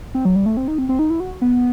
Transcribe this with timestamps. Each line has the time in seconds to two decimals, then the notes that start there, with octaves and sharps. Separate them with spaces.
0.14 C4
0.25 F#3
0.36 G3
0.46 A3
0.57 C4
0.68 D#4
0.78 C4
0.89 C4
0.99 D#4
1.10 E4
1.20 F#4
1.42 B3